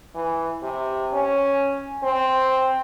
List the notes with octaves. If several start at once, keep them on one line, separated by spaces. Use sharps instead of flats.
E3
C3
C#4
C4